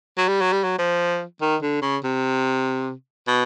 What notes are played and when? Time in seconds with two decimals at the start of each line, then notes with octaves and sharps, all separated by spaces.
0.17 F#3
0.28 G3
0.41 F#3
0.53 G3
0.64 F#3
0.79 F3
1.41 D#3
1.63 D3
1.82 C#3
2.04 C3
3.28 B2